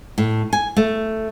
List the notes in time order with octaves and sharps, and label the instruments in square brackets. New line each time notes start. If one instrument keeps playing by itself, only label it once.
[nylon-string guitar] A2
G#5
A3